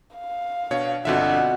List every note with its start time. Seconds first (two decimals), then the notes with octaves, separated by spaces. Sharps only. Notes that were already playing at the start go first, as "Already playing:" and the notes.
0.16 F5
0.71 B2 D4 C#5
1.05 G1 B2 D3 C4 F4 E5 F#5